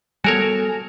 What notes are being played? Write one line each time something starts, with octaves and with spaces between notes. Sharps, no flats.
G3 B3 F#4 A4 A#4 C#5 G#5